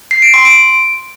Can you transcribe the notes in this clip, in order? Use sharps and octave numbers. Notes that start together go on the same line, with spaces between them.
C7
D7
C6
D7